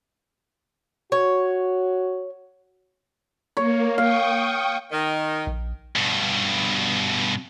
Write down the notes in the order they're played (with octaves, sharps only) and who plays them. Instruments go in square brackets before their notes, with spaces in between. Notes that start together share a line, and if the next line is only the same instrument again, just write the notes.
[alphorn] F#4 [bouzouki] C#5
[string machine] A#3 [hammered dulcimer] C#5
[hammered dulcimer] F5 [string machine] G5 C#6 D#6
[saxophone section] D#3
[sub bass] A#1
[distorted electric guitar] G2 B2